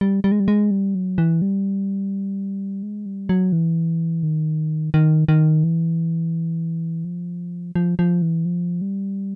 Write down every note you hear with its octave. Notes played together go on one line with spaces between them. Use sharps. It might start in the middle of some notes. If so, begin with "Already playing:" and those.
G3
G3
G#3
G3
G#3
G3
F#3
E3
G3
G#3
G3
F#3
E3
D#3
D#3
D#3
E3
F3
F3
F3
E3
F3
G3